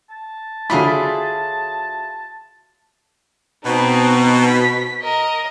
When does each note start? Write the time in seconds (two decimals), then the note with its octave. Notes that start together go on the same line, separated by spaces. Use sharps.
0.10 A5
0.70 D3 F#3 E4 F4 G#4 B5
3.64 B2 C4 D#4
4.49 B6
5.03 A#4 D#5